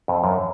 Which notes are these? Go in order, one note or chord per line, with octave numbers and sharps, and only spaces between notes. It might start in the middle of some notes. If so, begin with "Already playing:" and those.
F2
F#2